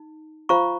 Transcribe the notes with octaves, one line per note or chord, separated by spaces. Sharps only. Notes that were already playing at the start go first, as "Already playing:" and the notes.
Already playing: D#4
F4 C5 F5 A#5 C#6